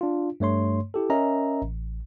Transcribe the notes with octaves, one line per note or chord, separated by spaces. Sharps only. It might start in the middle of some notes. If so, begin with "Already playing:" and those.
D4 F4
G2 A3 C#5 C6
E4 G4 A4
C#4 A#4 D#5 E5 A#5
A1